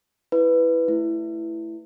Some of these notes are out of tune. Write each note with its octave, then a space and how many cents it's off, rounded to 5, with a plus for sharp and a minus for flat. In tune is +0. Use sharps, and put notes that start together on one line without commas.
E4 +0 B4 +5
A3 +0 E4 +10